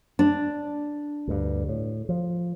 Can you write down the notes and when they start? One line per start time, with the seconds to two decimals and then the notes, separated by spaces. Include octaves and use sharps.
0.19 D4
1.28 D2 G2
1.68 A2
2.09 F3